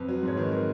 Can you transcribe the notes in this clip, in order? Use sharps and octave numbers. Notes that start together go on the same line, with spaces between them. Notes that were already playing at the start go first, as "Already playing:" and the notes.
Already playing: F2 B4
F#3
G#2 C#5
D#3 B4
A#4